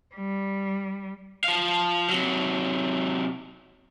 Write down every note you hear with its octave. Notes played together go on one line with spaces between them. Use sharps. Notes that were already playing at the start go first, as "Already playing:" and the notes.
G3
F3 F5
C3 F#3